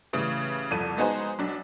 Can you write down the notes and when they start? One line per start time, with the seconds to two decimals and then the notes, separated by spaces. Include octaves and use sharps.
0.13 A2 C#3 E3 G3
0.71 C2 F2 A4 D#7
0.97 G#3 B3 D#4 F#4 G#4 C5
1.39 B1 D4